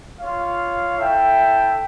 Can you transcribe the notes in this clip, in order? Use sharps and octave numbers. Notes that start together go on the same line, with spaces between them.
F4 C#5 F5
E4 A4 E5 G5